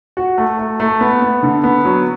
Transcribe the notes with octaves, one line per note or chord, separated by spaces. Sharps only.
F#4
A3
A3
A3
B3
B3
D3
B3
F#3